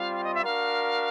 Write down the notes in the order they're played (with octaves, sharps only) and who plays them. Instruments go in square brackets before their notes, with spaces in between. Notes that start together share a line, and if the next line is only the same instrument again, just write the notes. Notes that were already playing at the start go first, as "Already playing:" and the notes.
Already playing: [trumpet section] G3 C4 F4 [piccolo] F5
[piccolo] D#5
E5
[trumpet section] D4 F#4 A#4 [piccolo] F5